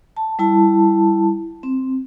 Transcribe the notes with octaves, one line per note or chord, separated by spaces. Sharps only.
A5
G3 E4 A5
C4